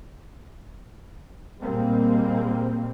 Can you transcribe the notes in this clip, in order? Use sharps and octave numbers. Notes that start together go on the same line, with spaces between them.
A#2 G3 G#3 A#3 C4